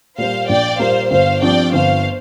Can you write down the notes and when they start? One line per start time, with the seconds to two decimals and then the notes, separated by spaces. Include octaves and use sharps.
0.18 A#2 G3 A#3 C5 F5
0.49 A#1 D5 G5
0.79 A#2 G3 A#3 C5 F5
1.11 G1 C5 F5
1.42 G2 F3 C4 D5 G5
1.73 G1 C5 F5